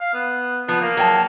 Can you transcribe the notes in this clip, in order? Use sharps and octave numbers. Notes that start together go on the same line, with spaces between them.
F5
B3
F3 B3
A#3
F#3 G5 A5